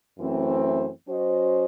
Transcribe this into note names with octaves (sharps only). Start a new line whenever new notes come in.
F#2 E3 A3 C4
F#3 C#4 F#4 C5 D#5